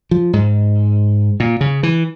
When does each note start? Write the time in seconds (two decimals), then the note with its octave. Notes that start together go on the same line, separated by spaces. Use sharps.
0.11 F3
0.33 G#2
1.40 A#2
1.61 C#3
1.83 E3